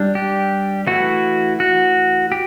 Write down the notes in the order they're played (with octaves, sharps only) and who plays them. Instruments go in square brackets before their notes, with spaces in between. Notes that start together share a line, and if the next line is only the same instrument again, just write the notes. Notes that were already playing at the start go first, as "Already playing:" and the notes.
Already playing: [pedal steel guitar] G3 D4
G4
E3 A3 E4 F#4
F#4
G4